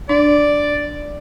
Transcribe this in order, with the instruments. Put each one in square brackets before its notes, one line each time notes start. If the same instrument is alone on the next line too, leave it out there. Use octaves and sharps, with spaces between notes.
[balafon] D4 [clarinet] D5